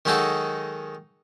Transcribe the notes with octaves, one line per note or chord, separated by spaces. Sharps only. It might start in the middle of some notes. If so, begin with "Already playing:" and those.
D#3 F#3 G#3 D#4 F#4 A4